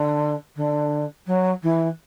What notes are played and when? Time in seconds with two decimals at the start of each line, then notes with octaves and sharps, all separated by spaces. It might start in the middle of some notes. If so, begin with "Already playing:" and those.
Already playing: D3
0.55 D3
1.26 F#3
1.62 E3